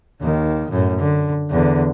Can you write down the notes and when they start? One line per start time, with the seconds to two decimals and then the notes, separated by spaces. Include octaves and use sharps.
0.21 D#2 D#3
0.70 F#2 A2
0.99 D3
1.50 E2 D3